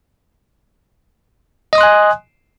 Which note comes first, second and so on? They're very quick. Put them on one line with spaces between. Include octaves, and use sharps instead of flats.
D#5 D#6 C6 F#6 G#5